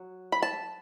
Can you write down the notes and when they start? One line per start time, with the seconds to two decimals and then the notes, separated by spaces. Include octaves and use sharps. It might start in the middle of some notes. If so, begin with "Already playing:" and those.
Already playing: F#3
0.32 B5
0.42 A5